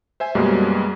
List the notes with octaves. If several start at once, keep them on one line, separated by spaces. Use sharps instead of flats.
C5 E5 G#5
F#2 B2 G3 G#3 A#3